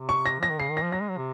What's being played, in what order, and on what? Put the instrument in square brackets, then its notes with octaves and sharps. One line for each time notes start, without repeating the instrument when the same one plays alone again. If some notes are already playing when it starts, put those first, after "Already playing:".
Already playing: [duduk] C3
[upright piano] C#6
A#6
[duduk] F3 [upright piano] A#6
[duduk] D#3
[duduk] C#3 [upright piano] C7
[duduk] D#3
[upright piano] A#6
[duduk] F3
[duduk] F#3 [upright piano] A#6
[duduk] G#3
F#3
C3